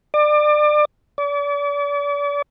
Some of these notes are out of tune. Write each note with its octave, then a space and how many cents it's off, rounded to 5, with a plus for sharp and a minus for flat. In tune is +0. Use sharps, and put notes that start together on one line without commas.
D5 +30
D5 -40